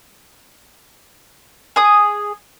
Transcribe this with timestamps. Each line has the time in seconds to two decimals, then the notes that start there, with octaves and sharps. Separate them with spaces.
1.76 G#4 D#6